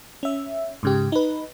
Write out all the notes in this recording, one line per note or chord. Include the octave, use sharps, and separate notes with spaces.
C#4 E5
G#2 C#3 G4
D#4 B4